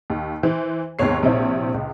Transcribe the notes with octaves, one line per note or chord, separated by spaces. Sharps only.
D#2
E3 C5
D#2 G#2 C3 B3 C#5 C7
A#1 C3 C4 E4 C#5
C#2